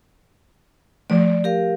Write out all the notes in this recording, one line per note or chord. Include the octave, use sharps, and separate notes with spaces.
F3 A3 D5
G4 A#4 F5